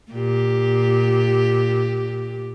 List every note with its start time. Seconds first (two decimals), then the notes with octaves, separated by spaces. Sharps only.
0.11 A#2 G4